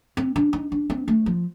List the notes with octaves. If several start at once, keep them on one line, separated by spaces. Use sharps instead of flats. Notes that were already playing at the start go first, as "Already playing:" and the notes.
C4
D4
D#4
D4
C4
A3
F3